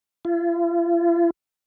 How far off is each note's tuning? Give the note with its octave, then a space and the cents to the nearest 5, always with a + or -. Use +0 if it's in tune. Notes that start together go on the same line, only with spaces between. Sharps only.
F4 -45